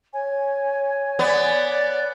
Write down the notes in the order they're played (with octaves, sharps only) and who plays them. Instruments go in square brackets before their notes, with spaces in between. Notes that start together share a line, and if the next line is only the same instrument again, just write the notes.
[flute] C#5 [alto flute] G#5
[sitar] B3 [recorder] D5